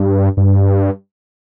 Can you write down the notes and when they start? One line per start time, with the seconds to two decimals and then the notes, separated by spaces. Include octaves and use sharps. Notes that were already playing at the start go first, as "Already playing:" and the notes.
Already playing: G2
0.37 G2